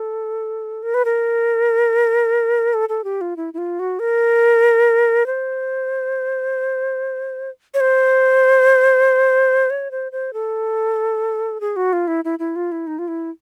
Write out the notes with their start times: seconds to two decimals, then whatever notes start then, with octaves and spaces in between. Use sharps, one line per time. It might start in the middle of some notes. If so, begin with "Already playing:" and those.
Already playing: A4
0.83 A#4
0.94 B4
1.05 A#4
2.74 A4
2.89 A4
3.04 G4
3.21 F4
3.37 E4
3.54 E4
3.58 F4
3.79 F#4
3.99 A#4
5.26 C5
7.74 C#5
7.80 C5
9.70 C#5
9.91 C5
10.12 C5
10.33 A4
11.61 G#4
11.76 F#4
11.93 F4
12.07 E4
12.25 E4
12.39 E4
12.56 F4
12.72 E4
12.87 D#4
12.99 F4
13.08 E4